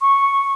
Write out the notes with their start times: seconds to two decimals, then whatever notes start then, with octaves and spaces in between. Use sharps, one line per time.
0.01 C#6